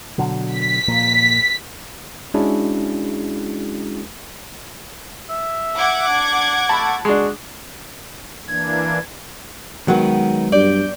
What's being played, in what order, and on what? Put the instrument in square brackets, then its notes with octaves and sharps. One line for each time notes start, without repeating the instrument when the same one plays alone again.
[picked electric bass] B2 D3 F#3
[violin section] B6
[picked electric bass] A#2 F3 A#3
[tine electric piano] G#3 C#4 D4 E4 F#4 G#4
[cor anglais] E5
[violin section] F#5 D6 G#6
[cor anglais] D4
[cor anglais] A3 [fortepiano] A5 B5
[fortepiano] G#3 D4 [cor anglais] F#4
[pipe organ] E3 A#3 D4 [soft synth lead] G#6
[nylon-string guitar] D#3 B3 [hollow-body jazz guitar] F#3 [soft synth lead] G#3
[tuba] G2 [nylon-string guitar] D5 [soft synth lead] G6